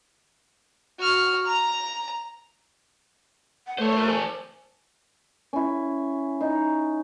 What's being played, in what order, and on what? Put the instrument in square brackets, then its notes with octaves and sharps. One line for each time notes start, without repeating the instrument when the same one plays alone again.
[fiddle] F#4 F6
A#5
[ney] F#5
[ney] A3 [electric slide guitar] C5 C#5
[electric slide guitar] A#4 C5
C5 G#5 A5
[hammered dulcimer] C#4 E4
D#4